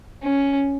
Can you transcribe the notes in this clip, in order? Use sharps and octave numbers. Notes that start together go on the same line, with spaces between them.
C#4